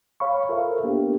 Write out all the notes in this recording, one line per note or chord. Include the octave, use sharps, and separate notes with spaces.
C#5 F5 B5 C#6
F4 A4 A#4 C5 E5 F5
A#3 B3 D4 G4